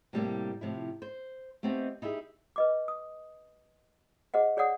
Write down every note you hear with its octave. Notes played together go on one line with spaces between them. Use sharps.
A2 C3 G3 A3 A#3
A2 C3 F3 E4
C5
A3 B3 C4 D#4 G4
D#4 E4 G4 G#4
B4 D#5 D6
D#6
G#4 C5 D#5 F#5
G#4 C#5 D5 F#5 D#6